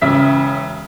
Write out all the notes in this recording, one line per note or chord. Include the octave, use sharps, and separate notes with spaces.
E1 C#3 E5 B6